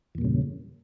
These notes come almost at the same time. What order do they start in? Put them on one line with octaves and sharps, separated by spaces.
E2 A#2 G2 C#3